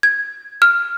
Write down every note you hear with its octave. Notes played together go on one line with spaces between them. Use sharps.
G#6
F6